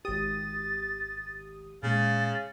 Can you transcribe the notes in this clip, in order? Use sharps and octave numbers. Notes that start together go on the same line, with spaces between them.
G#1 G4 D#6 A6
A#2 C#3 G#3 A6